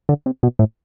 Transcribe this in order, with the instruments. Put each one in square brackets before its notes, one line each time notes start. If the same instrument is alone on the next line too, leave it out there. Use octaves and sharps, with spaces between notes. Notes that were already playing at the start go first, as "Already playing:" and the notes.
[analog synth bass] D3
C3
B2
A2